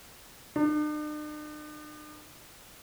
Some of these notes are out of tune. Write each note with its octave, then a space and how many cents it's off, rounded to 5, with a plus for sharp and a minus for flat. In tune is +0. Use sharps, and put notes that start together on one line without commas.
D4 +45